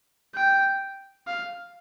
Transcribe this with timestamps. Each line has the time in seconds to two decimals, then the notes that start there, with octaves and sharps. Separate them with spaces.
0.35 G5
1.28 F5